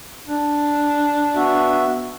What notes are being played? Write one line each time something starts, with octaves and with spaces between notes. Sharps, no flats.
D4
B3 F#4 E5